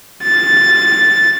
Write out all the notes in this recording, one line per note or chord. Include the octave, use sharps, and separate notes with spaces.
A6